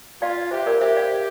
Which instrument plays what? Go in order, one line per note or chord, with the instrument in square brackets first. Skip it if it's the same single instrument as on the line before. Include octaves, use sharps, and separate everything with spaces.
[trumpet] F4 [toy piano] D5 F5
[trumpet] G4 [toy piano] C5 E5
[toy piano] A#4 D5
[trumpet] G4 [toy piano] C5 E5
[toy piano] D5 F5